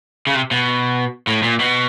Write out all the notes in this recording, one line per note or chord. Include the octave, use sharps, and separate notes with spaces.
C#3
C3
B2
A2
A#2
B2